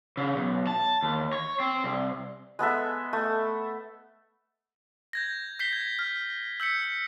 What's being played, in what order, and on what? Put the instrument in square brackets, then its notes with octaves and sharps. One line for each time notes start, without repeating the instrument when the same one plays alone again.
[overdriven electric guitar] C#3
B1
A5
D#2
C#5
C4
C2
[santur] G#3 B3 A4 E5
A3
[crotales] G6 G#6 A#6
G6 B6 C7 G7
G#6
F6
E6 G6 B6 C#7